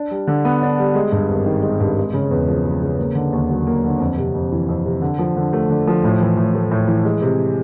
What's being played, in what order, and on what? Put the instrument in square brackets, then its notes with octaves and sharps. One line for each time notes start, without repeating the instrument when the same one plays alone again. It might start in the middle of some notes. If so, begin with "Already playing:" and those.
Already playing: [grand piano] D4
G3
D3
B3
D4
G3
G#3
G2
G#1
D#3
G#3
G2
G#3
C#3
E2
F3
G#3
C#3
A#3
D3
D#2
F#3
A#3
D3
F2
C3
F2
E3
F2
C3
D3
F3
D3
A3
D3
F3
A2
E3
A2
A3
A2
E3
G#3
C3